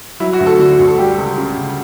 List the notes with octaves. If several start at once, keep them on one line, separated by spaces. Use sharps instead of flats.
F#3 E4
F#4
D2
A4
D3 F#4
D2
A4
G3 G4
C#2
C#3
C#2